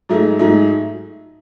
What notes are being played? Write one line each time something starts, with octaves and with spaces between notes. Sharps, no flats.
G#2 F#3 A3 D#4
G#2 F#3 A3 D#4